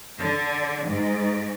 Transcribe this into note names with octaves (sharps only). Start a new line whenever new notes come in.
D3
G#2